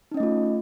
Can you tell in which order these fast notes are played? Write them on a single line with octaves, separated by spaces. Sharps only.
D#4 C#4 D#5 A3 F4